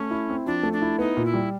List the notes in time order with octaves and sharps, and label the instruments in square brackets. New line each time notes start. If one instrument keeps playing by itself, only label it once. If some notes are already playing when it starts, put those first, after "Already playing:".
Already playing: [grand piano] A3 [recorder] C#4
[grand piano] E4
C4
[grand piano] F3 [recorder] D4
[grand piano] A3
[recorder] D4
[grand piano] E4
[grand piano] B3 [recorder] D#4
[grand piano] A#2
[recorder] E4
[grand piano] G3